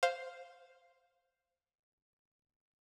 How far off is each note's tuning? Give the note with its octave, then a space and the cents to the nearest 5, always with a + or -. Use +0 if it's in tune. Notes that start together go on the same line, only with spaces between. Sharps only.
C5 +0 F5 +0